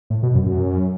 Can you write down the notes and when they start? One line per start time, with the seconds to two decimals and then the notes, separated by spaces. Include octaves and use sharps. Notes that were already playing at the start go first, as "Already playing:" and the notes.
0.10 A2
0.23 B2
0.34 F#2
0.46 F#2